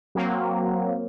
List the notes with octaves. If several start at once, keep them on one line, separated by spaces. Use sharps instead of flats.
F#3 A#3 C4